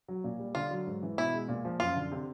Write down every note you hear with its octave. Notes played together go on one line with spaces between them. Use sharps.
F#3
A#2
G3
D3 F4
F#3
G#2
E3
B2 E4
G#3
A#2
F3
F#2 F4
D3
C3